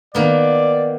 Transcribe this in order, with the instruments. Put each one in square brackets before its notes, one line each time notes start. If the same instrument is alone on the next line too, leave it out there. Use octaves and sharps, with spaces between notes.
[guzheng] D#3 A#3 B3 [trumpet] D5